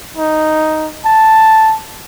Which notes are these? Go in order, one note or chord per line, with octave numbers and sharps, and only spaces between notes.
D#4
A5